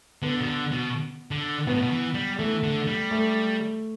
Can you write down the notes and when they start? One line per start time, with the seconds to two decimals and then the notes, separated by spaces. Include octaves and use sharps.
0.22 D3 B3
0.40 B2
0.47 D3
0.71 B2
1.31 D3
1.67 B2 B3
1.74 A2
1.82 B2
1.91 E3
2.14 G3
2.38 E3 A3
2.63 D3
2.87 G3
3.11 A3